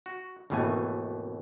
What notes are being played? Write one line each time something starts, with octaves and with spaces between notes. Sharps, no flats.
F#4
G#1 D#2 B2 E3 A3 G#5